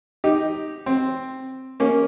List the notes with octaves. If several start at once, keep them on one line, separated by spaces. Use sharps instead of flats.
D#4 G4
C4
A#3 C#4